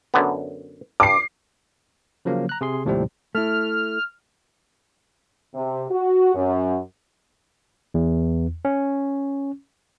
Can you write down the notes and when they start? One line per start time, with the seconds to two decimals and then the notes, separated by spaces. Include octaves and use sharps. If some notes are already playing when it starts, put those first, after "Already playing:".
0.14 F#2 D3 B3
1.00 G2 D6 C7
2.25 C#3 F3 F#3 A#3
2.49 A#5 F#6
2.61 C3 G#4 C6
2.85 D#2 A2 C3 F3 G3 C4
3.35 A3 E4 F6
5.54 C3
5.90 F#4
6.35 F#2
7.94 E2
8.65 C#4